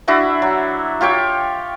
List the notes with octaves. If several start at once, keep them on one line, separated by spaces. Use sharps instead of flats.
D4 E4 F#4 E5
F#3
F4 G4 C#5 G5